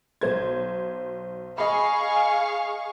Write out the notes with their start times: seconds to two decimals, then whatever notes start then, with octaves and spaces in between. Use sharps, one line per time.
0.21 B1 C5 G#6
1.58 G#4 D#5 F5 B5 C#6